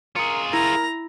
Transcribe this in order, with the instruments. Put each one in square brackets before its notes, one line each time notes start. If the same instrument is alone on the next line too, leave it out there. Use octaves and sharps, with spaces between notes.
[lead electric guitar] F4 G#4 [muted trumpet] A#4 [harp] C#7
[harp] E4 [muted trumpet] A#4 [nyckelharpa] A#5